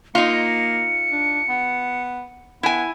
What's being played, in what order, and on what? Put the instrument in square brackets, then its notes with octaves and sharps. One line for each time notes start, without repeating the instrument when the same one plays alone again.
[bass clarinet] A#3 [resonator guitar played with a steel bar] D#4 F4 [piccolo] C#7
[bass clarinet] D4
B3
[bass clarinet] B3 [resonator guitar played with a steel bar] E4 G#5